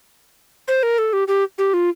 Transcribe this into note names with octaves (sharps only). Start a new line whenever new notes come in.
C5
A#4
A4
G4
G4
G4
F4